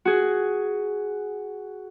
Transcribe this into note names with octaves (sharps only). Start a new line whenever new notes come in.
F#4 G#4